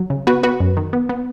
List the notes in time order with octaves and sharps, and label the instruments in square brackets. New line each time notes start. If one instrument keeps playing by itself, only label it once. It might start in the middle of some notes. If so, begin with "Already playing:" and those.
Already playing: [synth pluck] F#3
C#3
B3 F#4 B4
B3 F#4 B4
F#2
D#3
B3
B3